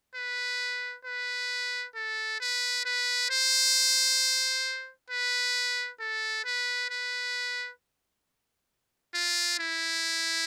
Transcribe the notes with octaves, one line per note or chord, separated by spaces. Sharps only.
B4
B4
A4
B4
B4
C5
B4
A4
B4
B4
F4
E4